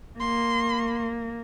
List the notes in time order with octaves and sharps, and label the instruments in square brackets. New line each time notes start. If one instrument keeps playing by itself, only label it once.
[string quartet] A#3 [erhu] C6